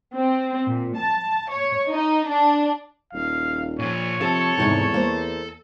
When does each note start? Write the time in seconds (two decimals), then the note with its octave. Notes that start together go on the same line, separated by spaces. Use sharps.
0.13 C4
0.66 A#2
0.97 A5
1.52 C#5
1.90 D#4
2.26 D4
3.13 D#1 F5
3.79 A#2 F3 C#5
4.21 C3 F3 A4 A5
4.58 E2 G#2 C3 D#3
4.94 A#3 C5